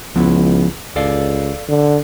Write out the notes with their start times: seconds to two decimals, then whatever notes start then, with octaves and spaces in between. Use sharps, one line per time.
0.16 C#2 F3 B3 E4
0.96 C#2 A4 D5 F5
1.69 D3